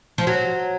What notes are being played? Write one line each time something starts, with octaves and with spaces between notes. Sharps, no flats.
F3
F#3